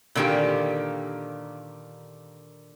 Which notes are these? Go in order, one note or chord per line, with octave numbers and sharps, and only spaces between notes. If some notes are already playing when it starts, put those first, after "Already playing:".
A#2 D3 D#3 A#3 G4